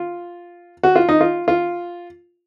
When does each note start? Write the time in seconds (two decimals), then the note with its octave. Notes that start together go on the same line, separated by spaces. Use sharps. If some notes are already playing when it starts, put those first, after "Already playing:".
Already playing: F4
0.83 F#4
0.96 F4
1.09 D#4
1.21 F4
1.48 F4